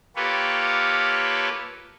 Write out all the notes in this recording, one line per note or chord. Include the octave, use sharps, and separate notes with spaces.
A#3 F4 G4 A4 B4 C#5